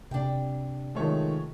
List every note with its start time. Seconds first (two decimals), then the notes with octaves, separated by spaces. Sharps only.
0.11 C3 D4 G5
0.95 D#3 F3 G#3 A3 C#5